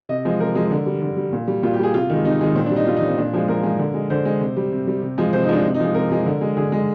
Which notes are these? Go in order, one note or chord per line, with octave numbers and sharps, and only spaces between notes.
C3 D#5
F3 G#3
C3 A#4
F3 G#3
D3
G3
D3
G3
A#2
G3
A#2 F4
G4
G3 G#4
C3 F4
D#3 G#3
C3 D#4
D#3 G#3
A#2 C4
G3 D4
D#4
A#2 F4
D#4
G3
C4
A#2 D4
F3 G#3
A#2 A#4
F3 G#3
D3
G#3
D3 C5
G#3
C3
G3
C3
G3
C3
F3 G#3
C3 C5
D#4
F3 G#3 D4
C3
D#4
F3 G#3
C3 A#4
F3 G#3
D3
G#3
D3 G#4
G#3